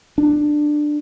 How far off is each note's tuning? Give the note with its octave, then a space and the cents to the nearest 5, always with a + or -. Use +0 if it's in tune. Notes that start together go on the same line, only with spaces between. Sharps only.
D4 +15